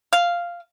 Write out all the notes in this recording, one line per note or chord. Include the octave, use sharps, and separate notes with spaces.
F5